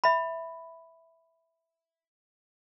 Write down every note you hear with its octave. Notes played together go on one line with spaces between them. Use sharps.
E5 B5